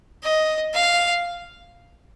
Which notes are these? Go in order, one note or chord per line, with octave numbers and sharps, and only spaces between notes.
D#5
F5